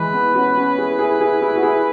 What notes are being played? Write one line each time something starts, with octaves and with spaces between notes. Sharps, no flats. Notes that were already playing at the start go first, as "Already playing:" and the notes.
Already playing: E3 G#3 B4
B3 E4
C#4 F#4
C#4 F#4
E4 G#4
E4 G#4
E4 G#4
E4 G#4
F#4
E4 G#4